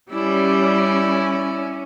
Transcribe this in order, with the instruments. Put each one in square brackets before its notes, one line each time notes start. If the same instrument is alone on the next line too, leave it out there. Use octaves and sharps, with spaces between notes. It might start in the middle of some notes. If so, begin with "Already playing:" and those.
[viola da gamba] G3 [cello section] C#4 [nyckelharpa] E4 D5